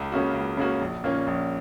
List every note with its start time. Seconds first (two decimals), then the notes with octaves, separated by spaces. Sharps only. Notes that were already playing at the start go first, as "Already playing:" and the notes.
Already playing: C#2
0.12 C#3 A#3 F#4
0.34 C#2
0.57 C#3 A#3 F#4
0.81 A#1
1.04 A#2 A#3 C#4
1.27 A#1